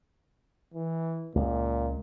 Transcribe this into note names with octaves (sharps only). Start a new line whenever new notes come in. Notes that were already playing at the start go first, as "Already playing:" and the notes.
E3
C#2 A#2